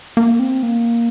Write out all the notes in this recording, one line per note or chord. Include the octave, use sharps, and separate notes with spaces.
A#3
C4
A#3